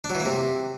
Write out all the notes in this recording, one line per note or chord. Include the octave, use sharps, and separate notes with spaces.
D4
F#3
E3
A#3
C3